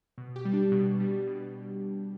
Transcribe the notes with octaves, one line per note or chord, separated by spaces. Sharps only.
B2
G4
G3
D4
B2
G3
B2